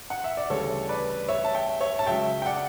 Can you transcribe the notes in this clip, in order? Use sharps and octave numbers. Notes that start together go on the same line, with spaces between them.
F#5
E5
D5
D2 C#3 E3 G3 A4 C#5
B4 D5
C#5 E5
A5
E5 G5
C#5 E5
A5
C#2 C#3 F#3 E5 G5
G5
D5 F#5